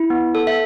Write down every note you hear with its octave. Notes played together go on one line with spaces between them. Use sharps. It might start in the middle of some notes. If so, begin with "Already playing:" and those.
Already playing: E4
B3
A4
E5